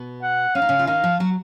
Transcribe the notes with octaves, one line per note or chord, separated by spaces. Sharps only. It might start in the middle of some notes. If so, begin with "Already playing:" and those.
Already playing: B2 B3
F#5
C#4 F5
D#4
C#3 C#4
F4
D#3 D#4 F5
F3 F4
F#3 F#4